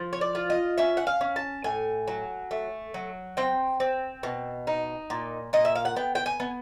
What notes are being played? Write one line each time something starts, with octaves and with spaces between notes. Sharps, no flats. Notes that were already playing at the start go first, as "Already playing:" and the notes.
Already playing: F3
C#5
D5
F4
D#5
C#4 E5
F#5
F5
C#4
A5
A2 G#5
F#3
A3
F#3
C4 G5
C4
B2
D#4
A#2
A#2 D#5
E5
F5
F#5
B3 G5
G5
G#5
B3